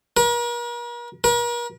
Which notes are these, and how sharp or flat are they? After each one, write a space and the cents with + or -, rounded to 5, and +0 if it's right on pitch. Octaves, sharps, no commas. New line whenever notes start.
A#4 +45
A#4 +45